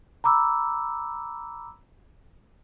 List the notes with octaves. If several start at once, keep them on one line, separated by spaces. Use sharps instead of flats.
A#5 B5 D6 E6